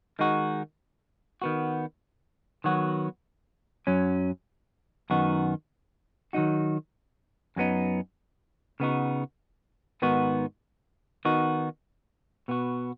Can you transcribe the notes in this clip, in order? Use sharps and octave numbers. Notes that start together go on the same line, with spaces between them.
D#3 G#3 D#4 F#4
D#3 B3 F#4
D#3 F#3 B3 F#4
F#2 F#3 C#4
F#2 D#3 B3 D#4 F#4
D#3 F#3 D#4 F#4
F#2 F#3 B3 D#4
C#3 B3 D#4 F#4
G#2 D#3 B3 D#4 F#4
D#3 B3 D#4 F#4
B2 B3 F#4